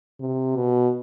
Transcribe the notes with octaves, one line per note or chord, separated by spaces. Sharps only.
C3
B2